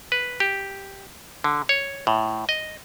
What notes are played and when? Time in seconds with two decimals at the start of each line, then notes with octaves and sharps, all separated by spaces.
0.12 B4
0.40 G4
1.44 D3
1.69 C#5
2.07 A2
2.49 D#5